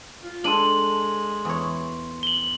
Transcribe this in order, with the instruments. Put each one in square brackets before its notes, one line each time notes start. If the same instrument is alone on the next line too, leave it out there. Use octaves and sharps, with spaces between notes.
[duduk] F4
[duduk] G#3 [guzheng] D4 A4 [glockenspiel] C6 D#7 F#7
[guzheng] E2 C#5
[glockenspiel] F#7 G7